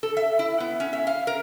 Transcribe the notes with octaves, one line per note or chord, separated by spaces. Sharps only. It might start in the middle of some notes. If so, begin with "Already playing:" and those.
A4
E5
E4
B3
C#4
E5
F5
A#4